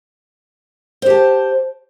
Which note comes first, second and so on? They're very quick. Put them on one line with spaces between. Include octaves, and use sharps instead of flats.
C5 G4 A5